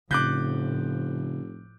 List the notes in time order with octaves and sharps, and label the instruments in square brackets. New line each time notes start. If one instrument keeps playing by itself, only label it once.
[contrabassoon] F1 [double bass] A2 F3 [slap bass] C#3 [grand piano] D6 F#6 G6